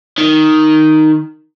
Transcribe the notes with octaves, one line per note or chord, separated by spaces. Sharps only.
D#3